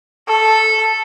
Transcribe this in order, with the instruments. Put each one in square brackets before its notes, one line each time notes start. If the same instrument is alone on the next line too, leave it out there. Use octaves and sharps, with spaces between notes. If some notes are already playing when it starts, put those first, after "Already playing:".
[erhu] A4